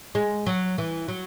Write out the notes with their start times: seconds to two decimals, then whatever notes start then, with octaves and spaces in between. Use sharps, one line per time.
0.15 G#3
0.47 F#3
0.78 E3
1.08 F#3